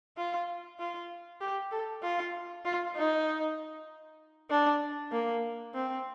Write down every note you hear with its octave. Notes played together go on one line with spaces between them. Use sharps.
F4
F4
G4
A4
F4
F4
D#4
D4
A#3
C4